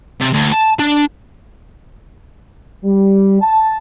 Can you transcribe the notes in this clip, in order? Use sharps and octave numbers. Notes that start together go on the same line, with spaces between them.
C3
D2
A5
D4
G3
A5